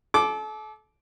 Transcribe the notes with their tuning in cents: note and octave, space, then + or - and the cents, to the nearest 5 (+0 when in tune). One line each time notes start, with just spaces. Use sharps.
A4 -35 D6 +0